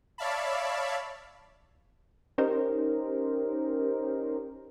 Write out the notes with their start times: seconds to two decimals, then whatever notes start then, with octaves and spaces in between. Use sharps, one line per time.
0.18 C#5 D5 E5 F5 A5 B5
2.38 C#4 D#4 G4 A#4 C5